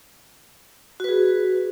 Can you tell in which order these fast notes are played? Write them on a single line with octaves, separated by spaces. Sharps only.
F#4 B4 G#4